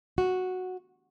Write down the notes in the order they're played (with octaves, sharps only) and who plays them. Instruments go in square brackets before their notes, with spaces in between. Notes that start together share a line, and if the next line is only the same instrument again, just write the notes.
[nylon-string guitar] F#4